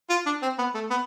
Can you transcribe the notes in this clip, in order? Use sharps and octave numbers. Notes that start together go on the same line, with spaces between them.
F4
D4
C4
B3
A3
B3